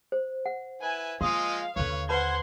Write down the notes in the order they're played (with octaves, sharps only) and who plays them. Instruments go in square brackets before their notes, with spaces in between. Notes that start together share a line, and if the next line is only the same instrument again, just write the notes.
[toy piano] C5
F#5
[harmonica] E4 B4 [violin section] G#5
[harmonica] F3 G#3 D#5 [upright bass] A#3 [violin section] F5 [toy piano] C6 D#6
[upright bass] D#2 D3 [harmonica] B4 C#5
[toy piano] B4 A5 B5 [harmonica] C5 [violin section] F#5 C6 G#6